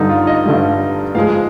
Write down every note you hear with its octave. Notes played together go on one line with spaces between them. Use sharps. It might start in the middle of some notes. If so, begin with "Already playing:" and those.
Already playing: G2 D3 G3 D#4
F4
D#5
G2 D3 G3
G#2 F3 G#3 F5